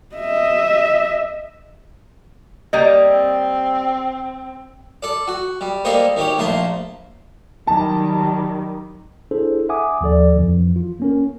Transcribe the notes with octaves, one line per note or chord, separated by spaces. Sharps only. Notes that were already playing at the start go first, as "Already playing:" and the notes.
D#5 E5
G3 A#3 D#5
C4
A4 D5
F#4
G3
G3 A#3 A4 C5 D#5
D#3 G4 C#5
A#1 A3 A#3 A5 C6
D#3 F#3 G3 A5
D4 E4 G#4 A4 C5
E5 F#5 G#5 D6 D#6
D#2 F3 A4 D5
F2 E3 F3
F4
A#3 C#4 A#4